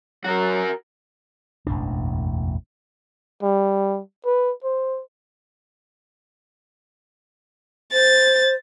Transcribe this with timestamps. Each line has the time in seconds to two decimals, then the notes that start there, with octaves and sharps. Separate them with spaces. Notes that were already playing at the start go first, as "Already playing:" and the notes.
0.24 F#3 F#4 A#4
1.67 E1 A1 F#2 D4
3.42 G3
4.25 B4
4.64 C5
7.93 C5 A6